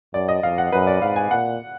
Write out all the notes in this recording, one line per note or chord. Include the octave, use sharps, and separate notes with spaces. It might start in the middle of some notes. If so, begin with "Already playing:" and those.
F#2 D5
D#5
F2 F5
F#5
F#2 B4
D5
G#2 F5
G#5
A#2 F#5